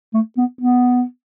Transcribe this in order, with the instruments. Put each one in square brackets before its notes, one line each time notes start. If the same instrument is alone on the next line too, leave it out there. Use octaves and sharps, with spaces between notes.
[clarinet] A3
B3
B3